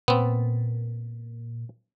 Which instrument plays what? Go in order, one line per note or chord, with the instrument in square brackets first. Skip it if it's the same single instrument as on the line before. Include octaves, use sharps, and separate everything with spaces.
[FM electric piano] A#2 [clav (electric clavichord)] B3 C4